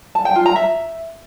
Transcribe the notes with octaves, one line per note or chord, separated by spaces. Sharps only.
A5
G5
F4
A#5
E5